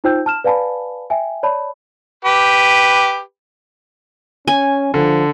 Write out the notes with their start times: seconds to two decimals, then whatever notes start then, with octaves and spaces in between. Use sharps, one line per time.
0.04 D#4 F4 C5 G5 E6 G6
0.26 A5 F6 E7
0.44 B4 D5 F5 G#5 A5 B5
1.10 E5 G5 G#5
1.43 C#5 D5 A5 B5
2.25 G4 B4
4.47 C#4 G#5
4.94 D3 F3